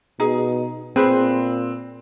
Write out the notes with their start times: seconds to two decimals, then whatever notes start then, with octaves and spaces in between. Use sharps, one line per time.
0.20 B2 D#4 G#4
0.96 A#2 C4 G#4 B4 C5